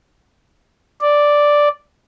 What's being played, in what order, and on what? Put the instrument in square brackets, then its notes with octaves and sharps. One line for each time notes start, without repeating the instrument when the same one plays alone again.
[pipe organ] D5